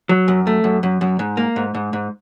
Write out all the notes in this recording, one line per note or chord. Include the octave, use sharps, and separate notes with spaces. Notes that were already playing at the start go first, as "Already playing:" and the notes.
F#3
F#2
A3
F#2
F#2
F#2
G#2
A#3
G#2
G#2
G#2